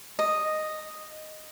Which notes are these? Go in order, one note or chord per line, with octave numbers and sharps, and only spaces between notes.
D#5